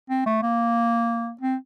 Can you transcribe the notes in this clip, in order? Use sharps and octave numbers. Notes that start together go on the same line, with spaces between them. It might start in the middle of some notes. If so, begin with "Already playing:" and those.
C4
A3
A#3
C4